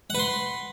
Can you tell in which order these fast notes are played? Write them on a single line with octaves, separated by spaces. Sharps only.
F#5 B4 C6